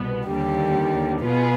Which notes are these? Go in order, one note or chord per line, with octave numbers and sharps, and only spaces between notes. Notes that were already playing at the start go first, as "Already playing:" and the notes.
Already playing: C2 B2 B3
D#2 D3 G3 G4
B2 B3 F4 G#4 B4